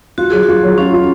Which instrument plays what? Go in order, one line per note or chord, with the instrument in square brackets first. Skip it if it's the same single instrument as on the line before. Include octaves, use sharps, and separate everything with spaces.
[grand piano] F4 [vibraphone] F#4
[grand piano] F#3 [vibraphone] G#4
[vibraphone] F#4
[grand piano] F4
F#3
[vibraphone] C#4 [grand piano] F4
[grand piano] F4